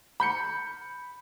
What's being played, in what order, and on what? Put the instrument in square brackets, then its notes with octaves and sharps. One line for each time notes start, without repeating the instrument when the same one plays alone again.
[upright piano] B5 G6 C#7